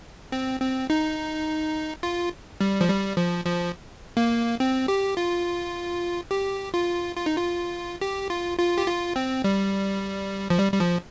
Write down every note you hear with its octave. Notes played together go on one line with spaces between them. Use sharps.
C4
C4
D#4
F4
G3
F3
G3
F3
F3
A#3
C4
G4
F4
G4
F4
F4
D#4
F4
G4
F4
F4
G4
F4
C4
G3
F3
G3
G3
F3